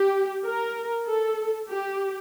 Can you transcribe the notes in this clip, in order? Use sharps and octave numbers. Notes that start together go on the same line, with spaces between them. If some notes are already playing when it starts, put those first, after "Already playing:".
Already playing: G4
A#4
A4
G4